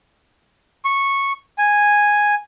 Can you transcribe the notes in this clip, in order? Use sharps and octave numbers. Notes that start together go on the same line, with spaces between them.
C#6
G#5